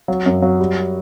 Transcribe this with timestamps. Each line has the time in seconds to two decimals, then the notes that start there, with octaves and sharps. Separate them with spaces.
0.08 F#3
0.26 F#2
0.42 F#3
0.59 G3